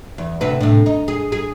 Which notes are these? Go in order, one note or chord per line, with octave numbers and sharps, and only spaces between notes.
E2
D2 C3 B4
A2 C3
D#4
G#4
G#4